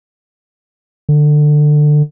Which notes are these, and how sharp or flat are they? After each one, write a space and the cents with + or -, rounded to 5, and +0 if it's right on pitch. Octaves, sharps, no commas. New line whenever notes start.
D3 +20